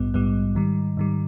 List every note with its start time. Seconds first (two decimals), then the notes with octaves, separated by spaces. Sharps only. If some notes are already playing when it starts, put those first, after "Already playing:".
Already playing: A#1 G#2 G3 B3
0.14 A#1 G#2 G3 B3
0.55 G#2 D#3 G3
0.97 G#2 D#3 G3